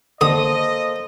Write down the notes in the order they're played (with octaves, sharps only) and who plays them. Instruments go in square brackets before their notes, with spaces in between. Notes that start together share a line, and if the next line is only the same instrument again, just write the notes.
[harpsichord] D3 [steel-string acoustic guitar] A#3 A4 C5 [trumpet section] D#5 [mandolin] D#6